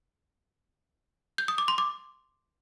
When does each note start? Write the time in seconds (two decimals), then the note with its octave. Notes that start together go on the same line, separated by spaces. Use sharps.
1.38 G6
1.48 D#6
1.58 D6
1.68 C6
1.78 D6